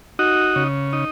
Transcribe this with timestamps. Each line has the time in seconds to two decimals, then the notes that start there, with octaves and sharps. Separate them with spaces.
0.19 D#4 F#4
0.56 C#3
0.93 D#4